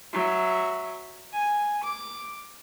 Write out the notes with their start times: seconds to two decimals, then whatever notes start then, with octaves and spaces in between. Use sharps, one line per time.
0.13 F#3 E5
1.33 G#5
1.84 D6